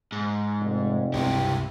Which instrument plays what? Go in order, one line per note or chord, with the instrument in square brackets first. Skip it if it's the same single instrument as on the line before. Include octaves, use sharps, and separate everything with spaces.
[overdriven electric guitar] G#2
[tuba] F1
[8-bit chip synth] C#2 G2 C3 [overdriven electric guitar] E4 G4